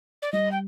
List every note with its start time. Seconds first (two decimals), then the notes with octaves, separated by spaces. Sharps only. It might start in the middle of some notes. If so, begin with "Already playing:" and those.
0.22 D5
0.32 G3 D#5
0.51 G5